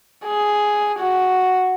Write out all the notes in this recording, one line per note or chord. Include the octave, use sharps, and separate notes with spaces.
G#4
F#4